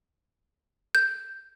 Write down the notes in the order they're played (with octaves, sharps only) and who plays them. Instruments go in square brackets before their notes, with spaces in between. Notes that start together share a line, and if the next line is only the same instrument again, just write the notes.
[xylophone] G6